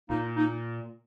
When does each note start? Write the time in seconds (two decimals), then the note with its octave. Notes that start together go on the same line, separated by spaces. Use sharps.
0.09 A#2 A#3 D#4
0.36 A#3 D#4